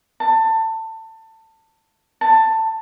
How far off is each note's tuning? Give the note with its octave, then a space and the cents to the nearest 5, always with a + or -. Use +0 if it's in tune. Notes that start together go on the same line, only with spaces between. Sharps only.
A5 +25
A5 +15